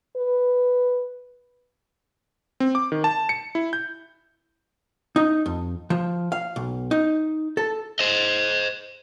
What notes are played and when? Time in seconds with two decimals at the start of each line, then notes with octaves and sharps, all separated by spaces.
0.16 B4
2.60 C4
2.75 D6
2.92 D#3
3.04 A5
3.29 C#7
3.55 E4
3.73 G6
5.16 D#4
5.46 F2
5.90 F3
6.32 F5
6.56 B1
6.91 D#4
7.57 A4
7.99 C5 D#5